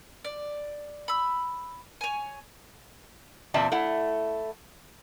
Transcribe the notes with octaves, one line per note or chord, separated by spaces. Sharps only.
D5
B5 E6
C#5 G#5
E2 A#2 C4 D5 E5 A5
A3 E4 F#5